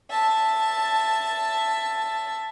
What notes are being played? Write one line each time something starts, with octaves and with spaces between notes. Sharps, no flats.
E5 A5